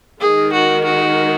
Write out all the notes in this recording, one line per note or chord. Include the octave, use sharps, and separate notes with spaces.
D#3 G#3 D#4 G#4 A#4
F#4
F#4